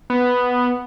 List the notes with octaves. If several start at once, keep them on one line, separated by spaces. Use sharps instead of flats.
B3